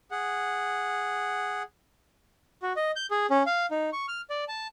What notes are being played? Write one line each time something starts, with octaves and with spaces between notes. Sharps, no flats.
G#4 F#5
F#4
D#5
G6
G#4
C#4
F5
D#4
C#6
F6
D5
A5